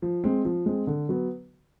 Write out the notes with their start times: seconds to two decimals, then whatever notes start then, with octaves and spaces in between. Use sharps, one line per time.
0.02 F3
0.24 G#3 C4
0.45 F3
0.66 G#3 C4
0.87 D3
1.09 F#3 B3